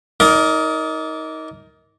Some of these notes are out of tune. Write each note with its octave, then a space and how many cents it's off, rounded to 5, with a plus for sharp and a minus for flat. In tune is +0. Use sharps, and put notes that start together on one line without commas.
D#4 +25 A#4 +0 D5 -20